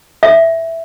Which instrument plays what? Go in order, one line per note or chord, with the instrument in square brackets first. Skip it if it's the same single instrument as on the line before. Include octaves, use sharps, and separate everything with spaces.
[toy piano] E5